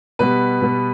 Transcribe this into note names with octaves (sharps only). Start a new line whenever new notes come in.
B2 G3 B3 B4
B2 G3 B3